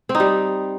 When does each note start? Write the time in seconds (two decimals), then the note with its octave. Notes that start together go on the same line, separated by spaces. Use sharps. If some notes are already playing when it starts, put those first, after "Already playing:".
0.09 C4
0.15 D#4
0.20 G3